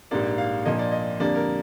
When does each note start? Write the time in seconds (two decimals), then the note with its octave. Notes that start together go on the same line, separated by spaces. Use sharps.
0.11 A#1 G#2 G3 A#3 D5
0.38 F5
0.65 A#1 A#2 F3 A#3 D#5
0.79 D5
0.92 D#5
1.20 F2 D3 G3 A#3 D5
1.36 A#4